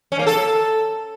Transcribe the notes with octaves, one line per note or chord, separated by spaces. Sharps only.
C#4
A#3
A4